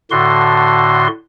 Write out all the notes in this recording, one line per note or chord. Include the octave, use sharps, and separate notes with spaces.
A2 D3 F#4 C6